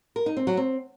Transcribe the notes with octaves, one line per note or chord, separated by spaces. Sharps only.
A#4
D#4
C4
F#3
C4